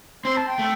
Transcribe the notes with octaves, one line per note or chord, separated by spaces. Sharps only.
C4 C6
A5
G5
A3